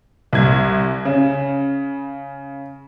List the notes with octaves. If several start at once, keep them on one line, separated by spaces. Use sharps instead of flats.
C2 G#6
C#3